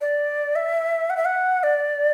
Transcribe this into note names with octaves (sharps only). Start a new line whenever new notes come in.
D5
E5
F#5
E5
F#5
D5